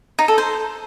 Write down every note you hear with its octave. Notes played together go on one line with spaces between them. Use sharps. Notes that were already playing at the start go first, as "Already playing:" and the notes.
D#4
A4
C5